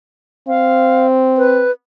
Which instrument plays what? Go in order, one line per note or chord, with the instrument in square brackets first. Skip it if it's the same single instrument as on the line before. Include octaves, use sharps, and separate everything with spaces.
[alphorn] C4 [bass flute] F5
[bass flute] B4